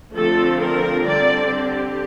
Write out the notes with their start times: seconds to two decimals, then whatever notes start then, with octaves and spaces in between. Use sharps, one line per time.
0.14 D3 F3 A3 C4 F4 A4
0.60 A#4
1.04 D3 G3 C4 D5
1.49 G4